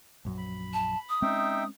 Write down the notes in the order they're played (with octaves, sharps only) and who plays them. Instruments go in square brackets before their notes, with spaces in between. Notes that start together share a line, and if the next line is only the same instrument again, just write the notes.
[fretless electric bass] A#1 F#2 F#3
[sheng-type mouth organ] B5
[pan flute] A5
D#6
[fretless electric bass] G#3 C4 C#4 [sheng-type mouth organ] D#4 E5 G5